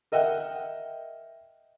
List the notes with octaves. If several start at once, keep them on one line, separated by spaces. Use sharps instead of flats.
A#4 D#5 E5 F#5 G5